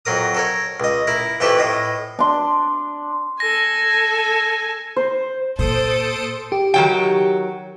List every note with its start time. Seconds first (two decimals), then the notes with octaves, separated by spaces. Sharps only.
0.05 F2 F#3 A#4 D#6
0.34 A4 A#4 C#5
0.80 C#2 D#5
1.07 E4 A#4
1.40 F2 E3 A3 G4 A4 B4
1.58 A2 D#5
2.19 D4 C6
3.40 A4 G#5 A#6
4.96 C5
5.59 A#2 A4 C5 D#6 D7
6.52 G4
6.74 D#3 F#3 G5